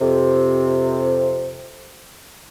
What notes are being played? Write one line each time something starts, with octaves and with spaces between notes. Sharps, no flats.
F2 C3